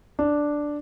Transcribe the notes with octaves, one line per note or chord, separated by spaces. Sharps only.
D4